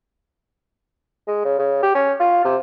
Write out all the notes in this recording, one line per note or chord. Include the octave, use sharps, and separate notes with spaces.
G#3
C#3
C#3
G4
C#4
F4
C3